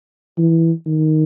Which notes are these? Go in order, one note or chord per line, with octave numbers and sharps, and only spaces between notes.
E3
D#3